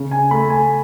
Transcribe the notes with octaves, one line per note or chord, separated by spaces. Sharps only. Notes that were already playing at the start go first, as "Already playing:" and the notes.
Already playing: C#3
G#5
A3 B5
G#5